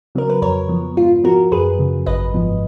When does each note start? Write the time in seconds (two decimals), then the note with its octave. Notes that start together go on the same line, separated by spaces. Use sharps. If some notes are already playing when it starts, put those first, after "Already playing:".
0.15 C#3 F#3 B3 A#4
0.30 B4
0.42 F2 A#4 C#5
0.69 F3 B3
0.96 G#2 F4
1.24 F3 B3 F#4 A#4
1.52 F#2 G#4 B4
1.79 C#3 F#3
2.06 G#1 B4 D#5
2.34 G#2 F3 B3